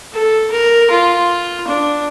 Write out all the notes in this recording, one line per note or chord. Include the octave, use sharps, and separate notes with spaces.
A4
A#4
F4
D4